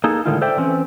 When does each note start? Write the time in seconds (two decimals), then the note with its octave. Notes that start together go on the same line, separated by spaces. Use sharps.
0.04 A#3 D#4 G#4 A4
0.26 A2 D3 D#3 G#3 D#4 F4
0.41 A4 C5 D5 E5 G5
0.57 E3 C4 C#4